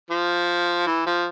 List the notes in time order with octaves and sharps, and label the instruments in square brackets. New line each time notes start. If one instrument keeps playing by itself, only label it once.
[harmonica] F3
E3
F3